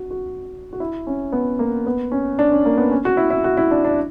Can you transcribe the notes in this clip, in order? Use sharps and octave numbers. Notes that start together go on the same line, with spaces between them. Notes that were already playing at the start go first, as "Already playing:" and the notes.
Already playing: F#4
F#4
F#4
E4
C#4
B3
A#3
B3
C#4
D4
C#4
A#3
B3
C#4
F#4
E4
E4
F#4
E4
D4
D4